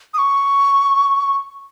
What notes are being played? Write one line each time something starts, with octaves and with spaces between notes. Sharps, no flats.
D#6
C#6